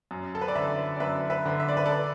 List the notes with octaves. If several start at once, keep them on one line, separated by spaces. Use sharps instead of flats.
F#2
A4
B4
D5
D3 B4 E5
D5
F#2 B4 E5
B4 E5
D3
E5
D5
B4
A4 D5